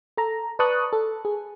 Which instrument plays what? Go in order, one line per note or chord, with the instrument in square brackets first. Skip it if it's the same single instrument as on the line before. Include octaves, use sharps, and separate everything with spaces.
[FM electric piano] A4 A#5
B4 D5 A5 C#6 D#6 F#6
A4
G#4